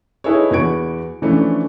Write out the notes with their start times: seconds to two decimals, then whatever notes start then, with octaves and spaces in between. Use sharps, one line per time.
0.24 D#4 E4 G#4 A4 B4 C#5
0.51 E2 F#4 B4 C#6 G#6 D7
1.22 E3 F3 A3 C#4 D4